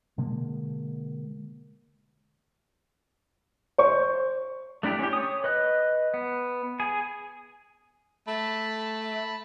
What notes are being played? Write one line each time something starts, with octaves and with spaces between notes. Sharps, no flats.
B2 D3 G#3 A#3
C5 C#6
A3 D4 E4 G4
C#4 G4
C#5 D#6
B4 D#5 F#6
B3
G#4 G#5
A3 A5 B5